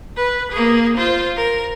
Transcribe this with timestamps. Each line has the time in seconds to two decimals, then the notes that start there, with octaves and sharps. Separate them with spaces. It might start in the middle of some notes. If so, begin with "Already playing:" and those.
0.17 B4
0.52 A#3 G#4
0.97 F4 C5
1.36 A#4